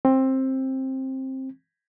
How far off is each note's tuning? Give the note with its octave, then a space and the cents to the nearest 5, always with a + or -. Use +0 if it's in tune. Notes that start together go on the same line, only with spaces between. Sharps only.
C4 +15